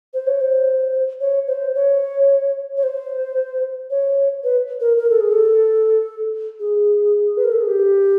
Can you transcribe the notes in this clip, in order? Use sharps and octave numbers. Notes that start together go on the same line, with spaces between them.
C5
C#5
C5
C#5
C5
C#5
C#5
C5
C#5
B4
A#4
A#4
A4
G#4
A4
G#4
B4
A#4
A4
G#4
G4